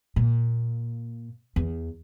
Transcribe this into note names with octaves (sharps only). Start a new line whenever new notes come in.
A#2
E2